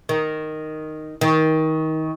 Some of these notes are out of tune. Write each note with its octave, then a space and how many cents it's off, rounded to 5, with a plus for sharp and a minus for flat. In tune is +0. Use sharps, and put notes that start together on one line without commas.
D#3 -5
D#3 +25